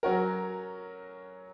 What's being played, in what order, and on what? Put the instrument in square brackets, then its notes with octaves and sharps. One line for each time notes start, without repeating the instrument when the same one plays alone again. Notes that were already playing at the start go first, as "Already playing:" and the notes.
[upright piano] F#3 C#4 F#4 A#4